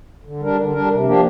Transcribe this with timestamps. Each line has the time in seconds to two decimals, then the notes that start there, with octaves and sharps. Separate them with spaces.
0.25 D3
0.40 G3 D4 A#4
0.57 D3
0.73 G3 D4 A#4
0.90 C3
1.05 F3 A#3 D4 G4